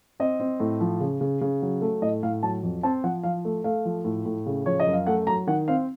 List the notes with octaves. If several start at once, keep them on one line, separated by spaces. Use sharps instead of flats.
C4 D#5
C4
A2
F3
C#3
C#3
C#3
F#3
A3
A2 D#5
A2 F5
F#3 A5
F2
C4 A5
F3 F#5
F3 F5
A3
A3 F5
F3
A2
A2
C#3
F3 C#5
D#5
F#2
F5
A3 F#5
F#3 A#5
D#3 F#5
C4 F5